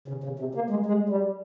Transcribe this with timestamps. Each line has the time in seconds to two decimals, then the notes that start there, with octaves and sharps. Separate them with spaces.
0.08 C#3
0.24 C#3
0.40 C3
0.55 A#3
0.70 G#3
0.86 G#3
1.09 G3